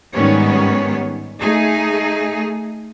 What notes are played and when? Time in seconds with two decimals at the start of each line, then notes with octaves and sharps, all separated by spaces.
0.14 G#2 D#3 G3 B3 C#4 C#5
1.40 A3 D#4 G#4